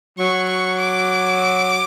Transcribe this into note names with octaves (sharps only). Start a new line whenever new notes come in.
F#3 C#6
C#6
D6